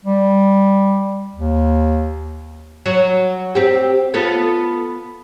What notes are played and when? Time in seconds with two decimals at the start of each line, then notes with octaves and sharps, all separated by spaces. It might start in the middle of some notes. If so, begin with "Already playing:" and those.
0.05 G3
1.35 D#2
2.86 F#3
3.55 C4 G4
4.14 B3 F4 A4